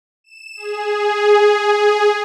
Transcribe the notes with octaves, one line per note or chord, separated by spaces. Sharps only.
E7
G#4